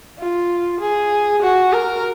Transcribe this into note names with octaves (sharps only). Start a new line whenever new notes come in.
F4
G#4
F#4
A#4